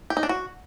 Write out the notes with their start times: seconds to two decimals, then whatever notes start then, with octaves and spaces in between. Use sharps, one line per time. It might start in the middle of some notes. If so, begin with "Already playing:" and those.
0.10 G4
0.17 D#4
0.23 D4
0.29 F#4